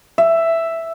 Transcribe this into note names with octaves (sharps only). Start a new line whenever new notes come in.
E5